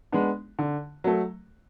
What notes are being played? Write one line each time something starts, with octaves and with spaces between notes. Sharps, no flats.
G#3 B3 D4
D3
F#3 A3